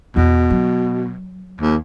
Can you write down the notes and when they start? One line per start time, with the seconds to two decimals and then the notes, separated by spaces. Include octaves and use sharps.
0.16 E2 B2 E4
0.50 F#3
1.61 D#2